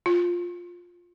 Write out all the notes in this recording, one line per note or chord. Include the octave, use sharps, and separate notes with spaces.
F4